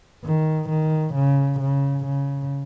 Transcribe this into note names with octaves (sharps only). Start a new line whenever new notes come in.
D#3
D#3
C#3
C#3
C#3